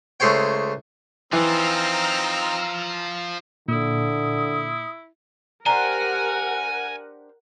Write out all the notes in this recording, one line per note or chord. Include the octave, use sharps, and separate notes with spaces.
C#2 A3 G#4 C5 C#5 G5
E3 F3 C4 D#4 F4 A#5 E6 F6
A#2 D3 E4 D#6
D4 G4 A#4 C5 F#5 G#5 A#5